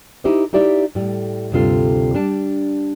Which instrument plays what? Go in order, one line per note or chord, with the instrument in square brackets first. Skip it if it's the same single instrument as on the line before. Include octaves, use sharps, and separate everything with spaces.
[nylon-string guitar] D#4 E4 G4 C5 D#5
D#4 E4 G4 D5 E5
A2 G3
D2 G2 C3 F4 A4
G3 D4 A5